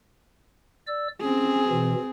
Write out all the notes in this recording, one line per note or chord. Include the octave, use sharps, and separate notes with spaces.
D5 E6
C4 C#4 G#4
B2 E3